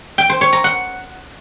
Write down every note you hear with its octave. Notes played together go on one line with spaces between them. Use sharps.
G5
C5
C#5
A#5
F#5